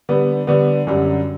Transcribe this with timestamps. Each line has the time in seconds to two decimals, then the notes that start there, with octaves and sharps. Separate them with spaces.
0.09 D3 G3 B3
0.47 D3 G3 B3
0.87 F#2 D3 G3